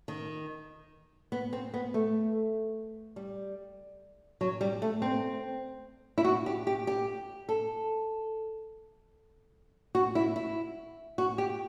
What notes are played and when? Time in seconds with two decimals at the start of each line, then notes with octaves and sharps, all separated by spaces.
0.08 D#3
1.32 B3
1.53 C4
1.74 B3
1.94 A3
3.16 G3
4.41 F#3
4.61 G3
4.82 A3
5.02 C4
6.18 E4
6.24 F#4
6.46 G4
6.67 G4
6.87 G4
7.49 A4
9.95 F#4
10.15 E4
10.36 E4
11.18 F#4
11.38 G4